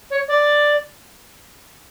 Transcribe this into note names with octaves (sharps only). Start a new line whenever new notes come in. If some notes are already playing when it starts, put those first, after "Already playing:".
C#5
D5